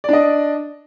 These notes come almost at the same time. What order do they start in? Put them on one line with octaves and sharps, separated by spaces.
D5 D4 D#5